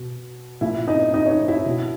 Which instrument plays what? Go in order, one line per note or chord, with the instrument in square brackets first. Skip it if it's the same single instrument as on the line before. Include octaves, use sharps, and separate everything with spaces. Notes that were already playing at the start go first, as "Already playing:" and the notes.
Already playing: [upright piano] B2
A#2 E4 E5
D#4 D#5
D#4 D#5
C#5
D#4 D#5
E4 E5
B2